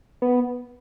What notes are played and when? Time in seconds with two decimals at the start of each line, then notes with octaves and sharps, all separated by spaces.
0.22 B3